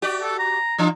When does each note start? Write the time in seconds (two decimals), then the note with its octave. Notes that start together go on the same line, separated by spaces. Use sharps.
0.02 F#4 G4 D5
0.22 A4
0.39 A#5
0.79 E3 D4 F4